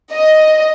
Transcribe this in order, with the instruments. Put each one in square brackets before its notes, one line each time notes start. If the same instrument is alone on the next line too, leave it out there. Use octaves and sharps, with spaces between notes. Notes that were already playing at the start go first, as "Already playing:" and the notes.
[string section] D#5